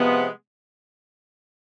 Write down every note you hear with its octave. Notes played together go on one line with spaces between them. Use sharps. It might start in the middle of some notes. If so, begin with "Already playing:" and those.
Already playing: C3 F3 G#3 B3